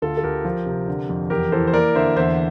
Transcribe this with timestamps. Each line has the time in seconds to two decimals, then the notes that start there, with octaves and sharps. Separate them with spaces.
0.02 D2 F4 A4
0.17 A4
0.23 D2 G4 A#4
0.45 F3
0.66 C3
0.88 D3
1.09 F2
1.30 E2 G4 A#4
1.52 E3 A4 C5
1.67 C5
1.73 A#3 A#4 D5
1.95 D3 C5 E5
2.16 E2 C5 E5